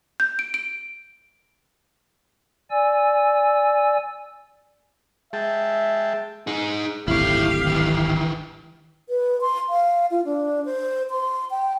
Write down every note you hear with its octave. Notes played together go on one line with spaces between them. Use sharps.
G6
D7
D7
D5 G#5 E6
G#3 E5 G5 A5
D#4 G#4
D1 G#1 A2 E4 G4 C#5 F5
D#3 E3
B4
C6
F5
F4
D4
C5
C6
G5